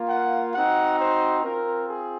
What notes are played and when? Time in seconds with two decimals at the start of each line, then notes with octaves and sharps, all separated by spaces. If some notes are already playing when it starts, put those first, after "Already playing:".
Already playing: A#3 F4
0.09 F#5
0.54 C4 D#4 F#4 F#5
0.98 C5
1.43 C4 F4 A#4
1.88 G#4